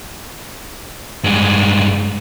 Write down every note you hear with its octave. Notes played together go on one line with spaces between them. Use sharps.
G2 G#3